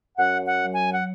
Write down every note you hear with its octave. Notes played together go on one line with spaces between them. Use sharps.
F#2 F#5
F#5
F#3
G#5
F#5